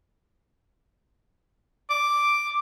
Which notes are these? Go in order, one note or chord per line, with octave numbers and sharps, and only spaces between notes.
D6